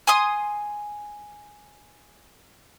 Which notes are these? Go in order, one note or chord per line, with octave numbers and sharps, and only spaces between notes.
G#5 C6 D#6